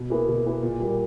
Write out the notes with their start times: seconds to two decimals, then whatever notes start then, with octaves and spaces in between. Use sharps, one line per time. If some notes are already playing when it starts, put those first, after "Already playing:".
Already playing: B2
0.10 A#3 E4 G#4 B4
0.28 B2
0.46 A#3 E4 G#4 B4
0.63 A#2
0.80 G3 A#3